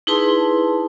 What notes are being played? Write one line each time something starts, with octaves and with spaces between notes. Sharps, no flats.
D#4 E4 G#4 B4 A5 C6